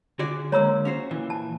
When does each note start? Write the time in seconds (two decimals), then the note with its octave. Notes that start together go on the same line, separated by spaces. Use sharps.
0.19 D3 F#4 G#4 D5
0.52 G#3 A#3 C#5 A#5 E6
0.85 C#4 F#4 C5
1.11 A#2 E3
1.30 A5